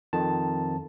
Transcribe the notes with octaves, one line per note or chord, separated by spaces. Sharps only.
F2 D#3 A5